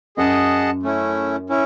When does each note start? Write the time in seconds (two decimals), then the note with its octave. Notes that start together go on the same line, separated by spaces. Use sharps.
0.17 F#2 G#4 D#5 F#5 A5
0.83 A3 C#4 E4
1.49 C#4 E4